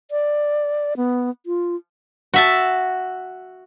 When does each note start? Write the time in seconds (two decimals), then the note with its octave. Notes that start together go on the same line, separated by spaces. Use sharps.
0.11 D5
0.97 B3
1.46 F4
2.34 F#4 E5 A5